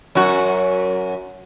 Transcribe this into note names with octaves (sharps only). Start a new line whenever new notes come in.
F#2 F#4